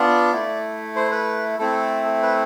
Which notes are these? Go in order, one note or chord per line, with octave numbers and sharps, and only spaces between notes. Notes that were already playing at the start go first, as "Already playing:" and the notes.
Already playing: B3 D4 F4 D5
A3 E4
C5
B4
A3 C4 E4 A4
B4